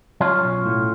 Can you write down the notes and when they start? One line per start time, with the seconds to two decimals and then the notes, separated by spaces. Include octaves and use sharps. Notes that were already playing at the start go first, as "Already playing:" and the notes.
0.21 F#3 C#4 F4
0.43 B1
0.66 A2